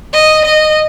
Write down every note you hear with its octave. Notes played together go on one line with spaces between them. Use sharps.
D#5
D#5